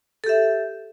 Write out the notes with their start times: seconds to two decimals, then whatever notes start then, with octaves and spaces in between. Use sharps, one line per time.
0.24 A4
0.26 G4
0.29 E5